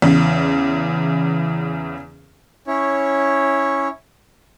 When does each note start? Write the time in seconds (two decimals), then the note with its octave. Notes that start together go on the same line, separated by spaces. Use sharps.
0.02 E2 C#3
2.67 C#4 E4 C#5